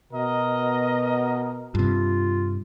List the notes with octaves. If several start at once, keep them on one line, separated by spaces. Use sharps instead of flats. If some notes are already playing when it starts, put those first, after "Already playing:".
B2 A#4 D#5
G2 C3 F4